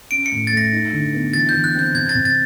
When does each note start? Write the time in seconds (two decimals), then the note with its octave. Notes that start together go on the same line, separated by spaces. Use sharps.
0.11 C#4 D7
0.26 C#7
0.32 A2
0.47 A6
0.51 A3
0.57 A#6
0.72 D#4
0.93 D3
1.13 B3
1.33 E3 A6
1.49 E3 G6
1.64 F#6
1.74 C4 G6
1.94 C3 G#6
2.09 A6
2.15 C3
2.25 A6